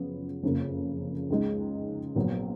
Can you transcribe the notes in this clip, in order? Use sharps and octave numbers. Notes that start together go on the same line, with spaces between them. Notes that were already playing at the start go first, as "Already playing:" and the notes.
Already playing: F#2 C#3 F3 B3
F#1 F2 C#3 F3 A#3
C#2 C#3 G#3 D#4
A#1 A#2 F#3 B3